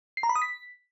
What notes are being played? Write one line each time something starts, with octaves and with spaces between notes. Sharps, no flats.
C7
A#5
B5
D#6
B6